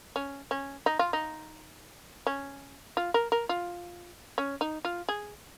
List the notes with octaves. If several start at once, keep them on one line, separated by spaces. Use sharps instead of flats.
C#4
C#4
D#4
F4
D#4
C#4
F4
A#4
A#4
F4
C#4
D#4
F4
G#4